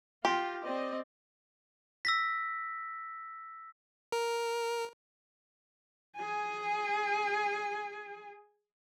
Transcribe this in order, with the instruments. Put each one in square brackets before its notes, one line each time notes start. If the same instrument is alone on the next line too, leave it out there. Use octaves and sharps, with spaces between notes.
[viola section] F4 [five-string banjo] G4 [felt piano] G5 C6 A#6
[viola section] C4 D5 D#5
[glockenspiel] E6 A#6 B6
[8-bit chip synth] A#4
[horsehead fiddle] G#4 G#5